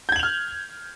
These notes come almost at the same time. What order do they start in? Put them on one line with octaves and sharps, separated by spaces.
G6 G#6 F#7 F7 F6